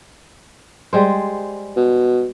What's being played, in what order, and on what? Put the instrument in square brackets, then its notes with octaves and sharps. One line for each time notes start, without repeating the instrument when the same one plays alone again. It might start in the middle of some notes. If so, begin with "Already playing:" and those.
[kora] G3 G#3 C5
[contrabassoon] B2